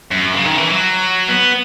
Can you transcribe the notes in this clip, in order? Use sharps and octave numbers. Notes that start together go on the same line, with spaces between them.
F#2
C#3
D#3
E3
F#3
B3